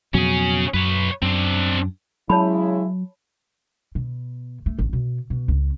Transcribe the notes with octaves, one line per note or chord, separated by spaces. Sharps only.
F2 B2 F#3 C#4 G#4
F#2 B4 C#5
F#2 C4 D4
C#3 F#3 G#3 E4 C#5 A5 B5
B2
A3
A1
B2
B2
C#2